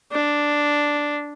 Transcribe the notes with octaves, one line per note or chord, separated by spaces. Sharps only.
D4